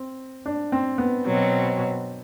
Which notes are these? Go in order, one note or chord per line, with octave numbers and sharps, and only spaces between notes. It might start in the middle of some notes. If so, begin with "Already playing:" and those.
Already playing: C4
D4
C4
B3
B2 F#3 C4